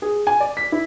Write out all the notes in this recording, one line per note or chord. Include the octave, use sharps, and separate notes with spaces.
G#4
G#5
D5
B6
E4